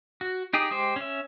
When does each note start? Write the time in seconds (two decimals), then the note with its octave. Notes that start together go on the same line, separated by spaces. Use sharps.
0.21 F#4
0.53 D#4 G4 G#4
0.71 G#3 G4 C5
0.96 C#4 E5